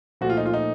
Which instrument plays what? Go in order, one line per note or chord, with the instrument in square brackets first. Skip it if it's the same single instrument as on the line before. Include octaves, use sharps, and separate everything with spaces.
[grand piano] A#2 F3 A3 F#4
F4
D#4
F4
D#4